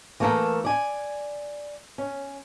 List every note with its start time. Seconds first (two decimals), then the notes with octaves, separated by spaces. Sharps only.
0.20 E3 A3 A#3 A4 A#4
0.65 D5 G#5
1.98 C#4